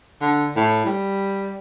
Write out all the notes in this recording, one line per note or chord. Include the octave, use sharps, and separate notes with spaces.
D3
A2
G3